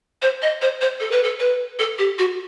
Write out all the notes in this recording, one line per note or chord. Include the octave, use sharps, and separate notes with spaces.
C5
D#5
C5
C5
A4
B4
A4
B4
A4
G4
F#4